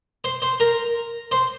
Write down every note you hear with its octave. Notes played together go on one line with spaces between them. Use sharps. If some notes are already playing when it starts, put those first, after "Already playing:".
C5
C5
A#4
C5